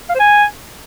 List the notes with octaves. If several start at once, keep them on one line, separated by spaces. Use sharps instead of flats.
F5
C5
G#5